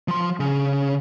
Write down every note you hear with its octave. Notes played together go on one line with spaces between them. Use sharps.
F3 C6
C#3